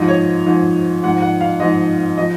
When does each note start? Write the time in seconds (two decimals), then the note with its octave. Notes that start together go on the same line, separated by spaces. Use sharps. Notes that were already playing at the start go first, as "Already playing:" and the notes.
Already playing: G#2 F3 D#5
0.09 C#5
0.46 G#2 F3
1.03 G#2 F3 F#5
1.22 F#5
1.41 F5
1.60 G#2 F3 D#5
2.18 F3 D#5